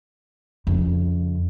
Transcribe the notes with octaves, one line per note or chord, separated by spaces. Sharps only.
F2 C#3